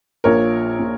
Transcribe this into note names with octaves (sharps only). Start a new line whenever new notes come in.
A#1 A#2 A#4 C#5
A#2